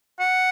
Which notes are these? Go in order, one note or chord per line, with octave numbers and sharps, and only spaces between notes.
F#5